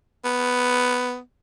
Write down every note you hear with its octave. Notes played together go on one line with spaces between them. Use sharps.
B3